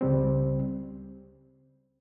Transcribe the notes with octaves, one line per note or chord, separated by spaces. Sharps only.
C#2 C#3 G3 C4